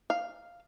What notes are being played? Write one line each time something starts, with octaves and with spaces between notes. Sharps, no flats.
F5